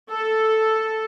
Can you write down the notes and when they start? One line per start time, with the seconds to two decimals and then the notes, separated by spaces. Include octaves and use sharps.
0.10 A4